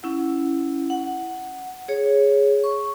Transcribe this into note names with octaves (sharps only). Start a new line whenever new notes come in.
C#4 E4 F#5
F#5
G#4 C#5
C#6